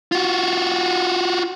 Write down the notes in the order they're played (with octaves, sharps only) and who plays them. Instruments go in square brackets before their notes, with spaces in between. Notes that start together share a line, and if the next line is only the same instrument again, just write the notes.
[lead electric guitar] F4 F#4